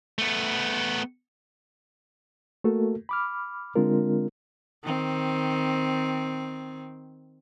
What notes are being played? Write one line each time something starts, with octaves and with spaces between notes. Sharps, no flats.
A3 B3
A3 A#3 F#4 A4 A#4
B5 D6 F6
D3 G#3 C4 D4 F4 A#4
D#3 C4